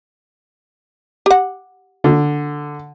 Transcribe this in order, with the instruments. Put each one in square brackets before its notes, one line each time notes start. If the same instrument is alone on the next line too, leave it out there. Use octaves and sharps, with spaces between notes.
[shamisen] G4 F#5
[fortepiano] D3